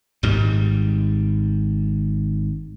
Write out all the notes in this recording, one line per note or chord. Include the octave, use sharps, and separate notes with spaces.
G#1 G#2 G3